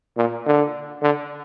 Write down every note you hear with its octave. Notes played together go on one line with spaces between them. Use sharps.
A#2
D3
D3